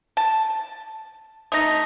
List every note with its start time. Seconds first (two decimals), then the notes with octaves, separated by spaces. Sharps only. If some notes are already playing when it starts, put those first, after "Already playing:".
0.17 A5
1.52 A3 D#4 D#6 A#6